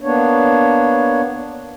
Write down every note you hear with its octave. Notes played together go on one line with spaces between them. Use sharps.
A#3 B3 D4 C#5